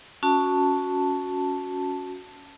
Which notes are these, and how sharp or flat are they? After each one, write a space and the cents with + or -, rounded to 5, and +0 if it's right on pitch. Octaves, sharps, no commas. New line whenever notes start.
C#4 +10 F#4 -15 A5 +0